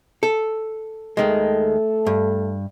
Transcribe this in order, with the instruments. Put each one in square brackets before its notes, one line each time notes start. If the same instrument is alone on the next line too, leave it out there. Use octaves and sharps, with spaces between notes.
[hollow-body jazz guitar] A4
[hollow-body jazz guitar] D#2 D#3 G#3 [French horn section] A3 A4
[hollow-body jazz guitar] G2